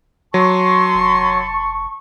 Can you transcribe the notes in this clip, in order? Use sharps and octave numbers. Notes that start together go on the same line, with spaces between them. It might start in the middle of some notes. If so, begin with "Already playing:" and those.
F#3 A5 C6 C#6
F1